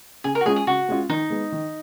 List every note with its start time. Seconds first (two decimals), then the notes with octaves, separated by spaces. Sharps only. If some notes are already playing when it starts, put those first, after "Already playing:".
0.24 C#3 G#4
0.35 A#4
0.41 F#4
0.46 G#3 C#4 F4 G#4
0.56 G#4
0.67 C#3 F#4
0.88 G#3 C#4 F4
1.09 D#3 D#4
1.30 G#3 B3
1.52 D#3